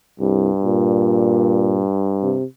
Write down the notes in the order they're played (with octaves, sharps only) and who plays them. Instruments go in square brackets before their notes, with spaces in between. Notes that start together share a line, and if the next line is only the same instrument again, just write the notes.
[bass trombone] C2 [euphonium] G2
[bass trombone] A#2
C3